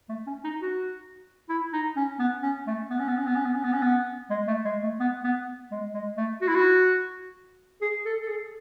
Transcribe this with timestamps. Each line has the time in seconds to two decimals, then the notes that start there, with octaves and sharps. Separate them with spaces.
0.09 A3
0.26 C#4
0.44 D#4
0.61 F#4
1.49 E4
1.73 D#4
1.96 C#4
2.19 B3
2.43 C#4
2.67 A3
2.90 B3
2.99 C#4
3.08 B3
3.18 C#4
3.27 B3
3.36 C#4
3.45 B3
3.54 C#4
3.64 B3
3.73 C#4
3.82 B3
4.30 G#3
4.48 A3
4.65 G#3
4.83 A3
5.00 B3
5.24 B3
5.71 G#3
5.94 G#3
6.17 A3
6.41 F#4
6.48 E4
6.55 F#4
7.82 G#4
8.05 A4
8.22 A4
8.28 G#4